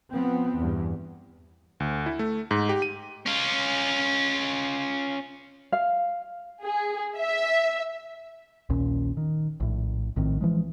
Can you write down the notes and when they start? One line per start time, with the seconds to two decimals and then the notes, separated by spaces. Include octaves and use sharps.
0.12 F3 B3 C4
0.57 E2 G2
1.80 D2
2.06 E4
2.19 A3
2.51 G#2
2.69 G4
2.82 D#7
3.26 C#4 F4
5.72 F5
6.63 G#4
7.17 E5
8.69 A#1 D#2 A#2 C#4
9.17 D#3
9.60 A#1 A2
10.16 A#1 A2 D#3 C4
10.41 E3 F3 G#3